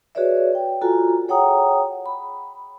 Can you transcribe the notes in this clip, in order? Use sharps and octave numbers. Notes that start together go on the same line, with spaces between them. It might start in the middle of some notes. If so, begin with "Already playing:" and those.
F#4 G#4 B4 C#5 D5 E5
G5
F4 F#4 A4 G#5 A#5
G#4 C#5 F#5 G5 A#5 D#6
B5